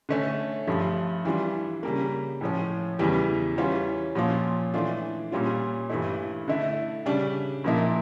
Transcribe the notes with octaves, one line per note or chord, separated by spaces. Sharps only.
D3 A3 C#4
G2 F3 A3
E3 G3 D4 F4
C#3 G3 A#3
A2 F3 C#4
E2 C#3 E3 G3
E3 G3 C#4 F4
A#2 F3 C#4 F4
E3 A3 D4 F4
A#2 G3 C#4 F4
G2 E3 A3 E4
D3 A3 E4
C#3 G3 D4
A#2 F3 A#3 E4